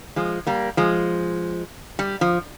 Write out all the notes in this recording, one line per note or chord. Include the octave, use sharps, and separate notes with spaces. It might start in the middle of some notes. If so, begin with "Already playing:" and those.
F3 G#3
G3 A#3
F3 G#3
G3
F3